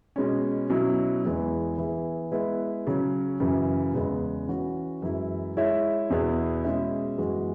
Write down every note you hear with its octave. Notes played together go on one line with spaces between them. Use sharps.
B2 G#3 C#4
B2 F#3 C#4 E4
E2 E3 G#3 B3 E4
E3 B3 G#4 B4 E5
G#3 B3 E4 B4 E5
C#3 F#3 C#4
F#2 C#3 E3
E2 C#3 G#3 B3
E3 C#4 F#4
F#2 E3 G#3 E4
G#3 E4 C#5 E5
E2 B2 B3 E4 G#4
B2 G#3 C#4 G#4 E5
F#2 E3 G#3 B3 F#4